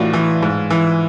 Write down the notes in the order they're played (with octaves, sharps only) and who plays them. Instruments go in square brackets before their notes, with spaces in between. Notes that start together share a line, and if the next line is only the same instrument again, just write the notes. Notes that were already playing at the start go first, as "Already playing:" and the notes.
Already playing: [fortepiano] A2 E3 D4 F4 F#4
E3
G#2
E3